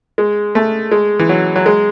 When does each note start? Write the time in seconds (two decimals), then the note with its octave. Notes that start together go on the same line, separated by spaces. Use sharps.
0.18 G#3
0.55 A3
0.92 G#3
1.19 E3
1.29 F#3
1.56 F#3
1.66 G#3